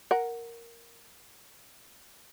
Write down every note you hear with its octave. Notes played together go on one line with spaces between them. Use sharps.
A#4 F#5